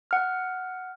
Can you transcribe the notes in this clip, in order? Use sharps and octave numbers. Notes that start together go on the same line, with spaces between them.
F#5 F6